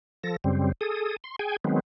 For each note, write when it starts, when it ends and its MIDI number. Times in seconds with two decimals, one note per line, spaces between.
0.24 0.36 53
0.24 0.36 69
0.24 0.36 94
0.44 0.72 42
0.44 0.72 49
0.44 0.72 55
0.44 0.72 60
0.81 1.16 68
0.81 1.16 69
0.81 1.16 87
1.24 1.36 84
1.39 1.56 68
1.39 1.56 79
1.39 1.56 80
1.64 1.80 51
1.64 1.80 54
1.64 1.80 56
1.64 1.80 59
1.64 1.80 60